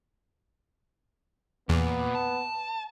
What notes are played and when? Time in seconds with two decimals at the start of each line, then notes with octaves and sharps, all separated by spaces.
1.69 E2 A#2 B3
2.15 A5